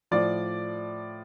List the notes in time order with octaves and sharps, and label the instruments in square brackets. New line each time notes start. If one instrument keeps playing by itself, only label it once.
[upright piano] A2 F3 D5